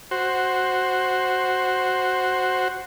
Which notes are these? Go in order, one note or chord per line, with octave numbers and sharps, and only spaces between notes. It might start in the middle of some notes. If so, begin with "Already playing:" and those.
F#4 C5